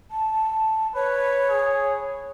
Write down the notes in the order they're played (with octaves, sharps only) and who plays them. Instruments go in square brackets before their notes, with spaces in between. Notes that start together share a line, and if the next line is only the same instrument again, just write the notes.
[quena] A5
[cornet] B4 [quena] C#5
[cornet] G#4